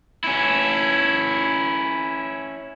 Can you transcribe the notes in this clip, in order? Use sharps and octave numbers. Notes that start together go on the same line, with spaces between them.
C#4 E4